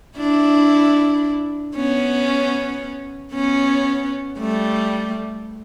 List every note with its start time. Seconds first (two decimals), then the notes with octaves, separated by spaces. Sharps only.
0.17 D4 E4
1.76 B3 C#4
3.34 B3 C#4
4.38 G3 A3